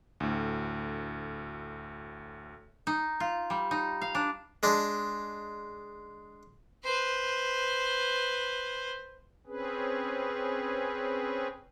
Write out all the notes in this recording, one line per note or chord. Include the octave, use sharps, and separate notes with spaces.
D2 A2
D#4
F4
G3
D#4
F5
D4
G#3 D4
B4 C5
C4 C#4 G#4 B4